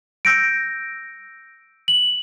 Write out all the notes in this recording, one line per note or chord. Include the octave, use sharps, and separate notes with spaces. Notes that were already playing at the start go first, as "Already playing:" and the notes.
E6 G6 A#6 C#7 D7
F#7